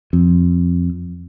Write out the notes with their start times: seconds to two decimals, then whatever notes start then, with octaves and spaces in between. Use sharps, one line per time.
0.13 F2